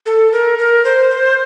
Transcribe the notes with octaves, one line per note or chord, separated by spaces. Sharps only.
A4
A#4
A#4
C5
C5